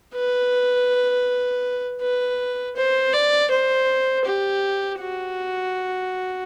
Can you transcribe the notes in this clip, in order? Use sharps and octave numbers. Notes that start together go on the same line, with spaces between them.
B4
B4
C5
D5
C5
G4
F#4